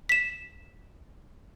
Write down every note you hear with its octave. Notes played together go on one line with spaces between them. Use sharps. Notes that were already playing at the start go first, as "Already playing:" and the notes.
B6 E7